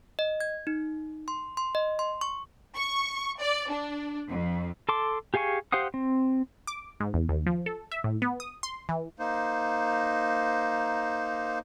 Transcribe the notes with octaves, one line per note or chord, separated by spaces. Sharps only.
D#5
G#6
D#4
C6
C6
D#5
C6
C#6
C#6
D5
D4
F2
A4 A5 C6 D6
G4 G#4 F5 G#5 C#6
G4 C5 F5 F#5 D#6
C4
D6
G#2
E2
D#2
F3
A4
E5
A2
B3
D#6
C6
E3
A#3 D#4 C5